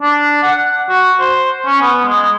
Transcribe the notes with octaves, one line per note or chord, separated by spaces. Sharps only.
D4
F#5
F#4
C5
C#4
B3
G#3